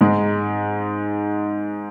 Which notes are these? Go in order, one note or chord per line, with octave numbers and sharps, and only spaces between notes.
G#2 G#3